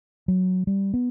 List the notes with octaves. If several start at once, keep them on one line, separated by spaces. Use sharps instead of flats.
F#3
G3
B3